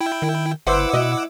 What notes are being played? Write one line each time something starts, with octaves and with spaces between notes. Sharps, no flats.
E4 G5
D#3
G1 E4 B4 C5 F#5 D6 E6
B2 E4 D#5